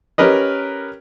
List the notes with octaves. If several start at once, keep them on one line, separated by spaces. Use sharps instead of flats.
C#4 G4 A#4 B4 D#5